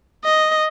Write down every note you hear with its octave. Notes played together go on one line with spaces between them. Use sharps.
D#5